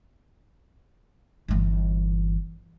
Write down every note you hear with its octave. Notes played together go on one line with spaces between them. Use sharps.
G1 E3